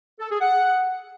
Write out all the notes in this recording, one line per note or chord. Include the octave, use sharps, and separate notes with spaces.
A4
G#4
F#5